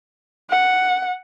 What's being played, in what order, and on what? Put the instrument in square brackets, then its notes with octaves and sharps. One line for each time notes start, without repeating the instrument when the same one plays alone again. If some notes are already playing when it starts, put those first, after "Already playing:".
[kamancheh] F#5